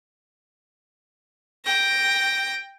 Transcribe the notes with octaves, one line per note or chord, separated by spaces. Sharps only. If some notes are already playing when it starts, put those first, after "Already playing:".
G5 A#6